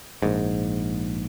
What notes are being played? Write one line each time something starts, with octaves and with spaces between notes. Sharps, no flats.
A#1 G#2